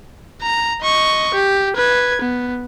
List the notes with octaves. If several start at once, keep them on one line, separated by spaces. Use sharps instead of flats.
A#5
D#5 C#6
G4
B4 G#6
B3